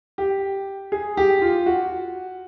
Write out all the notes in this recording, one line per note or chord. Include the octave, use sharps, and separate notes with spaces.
G4
G#4
G4
F4
F#4